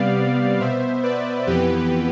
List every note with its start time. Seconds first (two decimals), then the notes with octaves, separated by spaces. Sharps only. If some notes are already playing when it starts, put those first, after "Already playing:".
Already playing: C3 G3 B3 D5 F5
0.60 B2 B3 C5 E5
1.03 B4 D5
1.47 F2 E3 B3 G4 B4